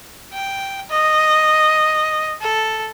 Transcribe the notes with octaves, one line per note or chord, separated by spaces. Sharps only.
G5
D#5
A4